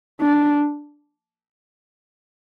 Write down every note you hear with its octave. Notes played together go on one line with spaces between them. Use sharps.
D4